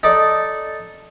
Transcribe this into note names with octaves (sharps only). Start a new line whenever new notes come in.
D#4 A4 D5 A5